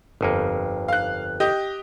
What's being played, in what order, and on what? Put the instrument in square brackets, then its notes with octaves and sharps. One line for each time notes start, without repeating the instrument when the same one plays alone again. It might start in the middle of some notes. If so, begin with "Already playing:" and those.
[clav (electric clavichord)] G1 F2 A#3
[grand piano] F5 F#6
G4 D#5